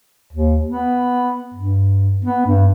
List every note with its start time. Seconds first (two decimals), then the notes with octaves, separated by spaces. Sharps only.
0.33 D#2
0.67 B3
1.54 G2
2.25 B3
2.46 G2